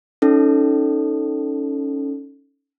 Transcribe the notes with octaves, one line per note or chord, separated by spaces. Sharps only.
C#4 D#4 A4